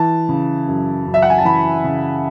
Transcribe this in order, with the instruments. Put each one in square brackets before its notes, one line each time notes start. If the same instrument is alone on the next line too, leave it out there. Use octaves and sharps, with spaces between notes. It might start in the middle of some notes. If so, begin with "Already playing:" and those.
Already playing: [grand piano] E3 A5
C#3
F#2
F#2
E5
F#5
G#5
A5
E3 B5
C#3